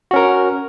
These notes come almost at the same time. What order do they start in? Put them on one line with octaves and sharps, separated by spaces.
F#4 C#4 A#4